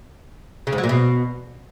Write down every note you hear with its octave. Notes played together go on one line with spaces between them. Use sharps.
C#3
G#2
F#3
A#2
B2